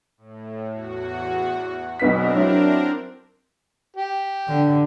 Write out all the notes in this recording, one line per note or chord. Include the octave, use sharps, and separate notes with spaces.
A2
E2 F#4
B1 B3 C4 D4 A#4 B6
F#3 E4
G4
D3